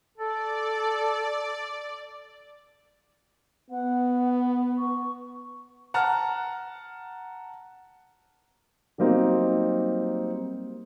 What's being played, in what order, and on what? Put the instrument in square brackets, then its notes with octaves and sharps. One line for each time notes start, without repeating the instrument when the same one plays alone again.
[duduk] A4 [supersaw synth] D5
[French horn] B3 [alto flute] F#5
[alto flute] C#6
[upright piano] F#5 A5 A#5 F6
[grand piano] F#3 G3 A#3 C4 D#4